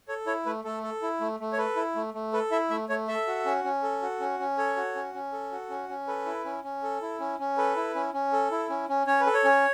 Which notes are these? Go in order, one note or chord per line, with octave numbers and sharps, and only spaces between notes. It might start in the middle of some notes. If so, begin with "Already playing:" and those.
A4 C#5
E4 C#5
A3 B4
A3 A4
A4
E4
A3
A3
C#5
A4 B4
E4
A3
A3
A4 B4
E4 E5
A3 E5
A3 C#5
A4 E5
F#4
C#4
C#4
A4
F#4
C#4
C#4
A4 C#5
F#4
C#4
C#4
A4
F#4
C#4
C#4
A4 B4
E4
C#4
C#4
A4
E4
C#4
C#4
A4 B4
E4
C#4
C#4
A4
E4
C#4
C#4
C#4 C#5
B4
A4
C#5
C#4